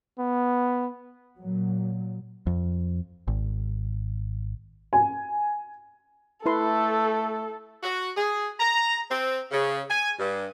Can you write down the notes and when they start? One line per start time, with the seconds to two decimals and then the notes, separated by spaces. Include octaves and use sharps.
0.19 B3
1.38 A#2 F#3
2.47 F2
3.28 G#1
4.93 G#5
6.46 A3 E4 A4 B4 C6
7.83 F#4
8.16 G#4
8.59 A#5
9.10 C4
9.52 C#3
9.89 G#5
10.18 G2